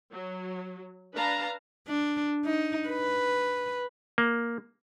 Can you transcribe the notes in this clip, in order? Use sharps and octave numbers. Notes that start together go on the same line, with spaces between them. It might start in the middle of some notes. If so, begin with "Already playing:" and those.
F#3
D4 B4 F5 A5 A#5
D4
D#4
B4
A#3